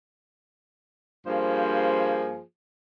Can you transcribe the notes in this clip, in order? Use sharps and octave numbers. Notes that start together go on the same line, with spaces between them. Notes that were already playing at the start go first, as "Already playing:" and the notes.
G2 F3 A#3 G#4 C5